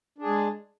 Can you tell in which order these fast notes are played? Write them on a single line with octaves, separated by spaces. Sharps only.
D4 G#4 G#3